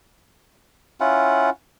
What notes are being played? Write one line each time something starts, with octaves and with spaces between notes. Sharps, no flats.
C#4 E4 F4 F#5